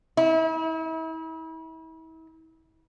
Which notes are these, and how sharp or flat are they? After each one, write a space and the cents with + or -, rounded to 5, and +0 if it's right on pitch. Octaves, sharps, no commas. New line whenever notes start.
E4 -40